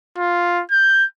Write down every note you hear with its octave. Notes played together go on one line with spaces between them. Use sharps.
F4
G6